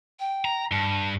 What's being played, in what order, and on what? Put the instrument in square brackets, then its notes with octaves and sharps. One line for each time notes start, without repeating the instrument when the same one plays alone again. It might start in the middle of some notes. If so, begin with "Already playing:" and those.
[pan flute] G5
[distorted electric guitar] A#5
[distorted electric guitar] G2 [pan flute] A5